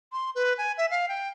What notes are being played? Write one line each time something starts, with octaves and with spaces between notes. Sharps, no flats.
C6
B4
G#5
E5
F5
G5